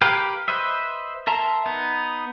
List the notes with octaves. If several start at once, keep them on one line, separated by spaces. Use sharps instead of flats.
G4 A#4 B4 F5 G5
B4 C5 D#5 E5
A#4 E5 A5 A#5 C6
B3 D#4